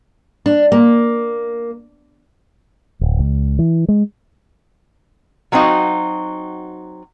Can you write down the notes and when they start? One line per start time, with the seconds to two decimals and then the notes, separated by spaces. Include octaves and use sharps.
0.46 D4
0.72 A#3
3.01 D1
3.19 C#2
3.59 E3
3.88 G#3
5.52 F#3 A3 C4 D#4 F#4 F5